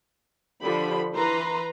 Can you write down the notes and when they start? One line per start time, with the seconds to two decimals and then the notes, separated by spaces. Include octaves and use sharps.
0.62 D3 F3 G4 B5
1.12 E3 B4 A#5 C6